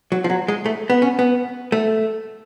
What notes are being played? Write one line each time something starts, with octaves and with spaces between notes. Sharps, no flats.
F#3
F3
F#3
G#3
A3
B3
C#4
B3
A3